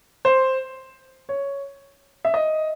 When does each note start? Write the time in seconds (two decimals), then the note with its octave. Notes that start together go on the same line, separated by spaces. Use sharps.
0.25 C5
1.29 C#5
2.25 E5
2.34 D#5